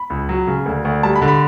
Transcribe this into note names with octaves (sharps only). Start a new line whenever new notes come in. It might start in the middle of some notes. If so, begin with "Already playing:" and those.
Already playing: B5
C#2
F#3
C#3
D2
D2
G3 A5
B5
D3
B5